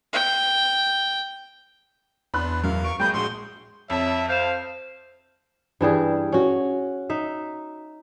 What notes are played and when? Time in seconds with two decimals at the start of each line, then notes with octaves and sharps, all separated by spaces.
0.13 G5
2.34 E2 B3 D4 B5 C6 F#6
2.64 F#2 A#4 F5
2.84 C#6 D7
3.00 F#3 G#3 A#3 G5 B5 D#6 G6
3.14 A#1 F#4 C6 C#6
3.90 F2 C#5 E5 A5
4.29 C5 F5 G6 E7
5.81 G2 E3 G3 G#4
6.32 C#4 F#4
7.10 D#4 E5